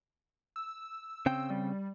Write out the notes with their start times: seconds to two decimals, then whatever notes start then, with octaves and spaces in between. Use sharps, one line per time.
0.56 E6
1.26 C#3 C4 G5
1.50 G3